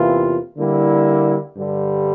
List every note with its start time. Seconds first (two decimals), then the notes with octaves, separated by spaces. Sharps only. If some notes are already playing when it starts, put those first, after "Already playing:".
Already playing: E2 C3 E3 A#3 F4
0.58 D3 G3 A#3 E4
1.57 G2 D3 G3